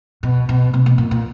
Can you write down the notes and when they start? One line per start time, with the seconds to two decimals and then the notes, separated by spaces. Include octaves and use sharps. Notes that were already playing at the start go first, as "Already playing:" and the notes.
0.23 B2
0.49 B2
0.74 C3
0.86 B2
0.98 A#2
1.11 A#2